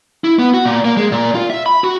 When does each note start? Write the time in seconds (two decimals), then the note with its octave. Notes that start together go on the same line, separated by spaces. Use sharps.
0.24 E4
0.39 B3
0.54 F#4
0.66 A#2
0.85 A#3
0.97 G#3
1.12 A#2
1.35 F4
1.50 E5
1.66 B5
1.84 F#4